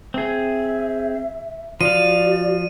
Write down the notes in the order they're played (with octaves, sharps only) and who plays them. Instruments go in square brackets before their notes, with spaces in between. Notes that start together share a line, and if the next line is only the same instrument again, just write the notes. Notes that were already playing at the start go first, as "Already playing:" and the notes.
[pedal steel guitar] C4 G#4 [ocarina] E5
[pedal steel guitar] F3 F5 [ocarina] F#4 [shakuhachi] D5 [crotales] D#7